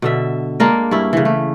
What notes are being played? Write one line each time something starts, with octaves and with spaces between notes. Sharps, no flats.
B2 D3 E5
G#3 A#3 D4 A#4
G2 C#4 E4
C#3 E3
A3